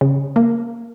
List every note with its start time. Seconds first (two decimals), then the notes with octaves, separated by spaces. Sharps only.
0.01 C#3
0.36 A#3